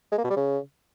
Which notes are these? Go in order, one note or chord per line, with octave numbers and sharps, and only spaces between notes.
G#3
A#3
B2
G3
C#3